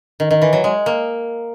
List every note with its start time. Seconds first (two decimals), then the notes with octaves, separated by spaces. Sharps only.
0.20 D#3
0.31 D#3
0.42 E3
0.53 F#3
0.64 G#3
0.86 A#3